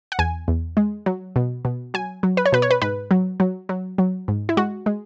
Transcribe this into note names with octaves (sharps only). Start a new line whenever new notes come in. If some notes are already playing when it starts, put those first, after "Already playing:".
F#5
E2 G#5
E2
G#3
F#3
B2
B2
F#3 G#5
F#3
B4
C#5
B2 B4
C#5
B4
G#2 B4
F#3
F#3
F#3
F#3
G#2
E4
G#3 F#4
G#3